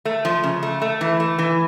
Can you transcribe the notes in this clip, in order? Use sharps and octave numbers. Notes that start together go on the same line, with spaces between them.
A3
F3
C#3
A3
A3
E3
A3
E3